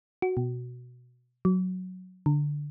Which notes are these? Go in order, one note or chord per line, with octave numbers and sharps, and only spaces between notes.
F#4
B2
F#3
D3